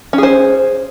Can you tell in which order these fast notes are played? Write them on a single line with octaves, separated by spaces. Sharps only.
C#4 G#4 C5